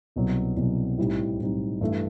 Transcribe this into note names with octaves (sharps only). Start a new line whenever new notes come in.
C2 B2 F#3
C2 B2 F#3
B1 A2 G3 C4 D#4
B1 A2 G3 C4 D#4
G2 E3 A3